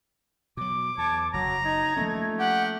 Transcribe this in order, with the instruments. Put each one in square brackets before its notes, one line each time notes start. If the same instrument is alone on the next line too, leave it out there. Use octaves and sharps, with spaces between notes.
[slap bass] B2 F#3 [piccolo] D6
[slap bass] E2 [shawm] C#5 [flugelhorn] A5
[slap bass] F#1 [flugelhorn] F#3 [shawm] A#5
[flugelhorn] D#4 [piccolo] G#6
[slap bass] F3 A#3 C#4 [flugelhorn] A3
[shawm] G4 [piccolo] F#5